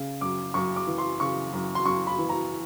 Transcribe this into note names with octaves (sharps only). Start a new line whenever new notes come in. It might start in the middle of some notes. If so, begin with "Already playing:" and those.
Already playing: C#3
F#2 D6
F#2 C#6
D6
E3
C6
C#3 C#6
F#2
C6
F#2 C#6
B5
E3
A#5